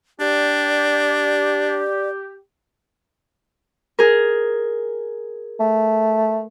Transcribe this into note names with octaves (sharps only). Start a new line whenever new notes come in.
D4 G4 D5
G#4 A#4
A3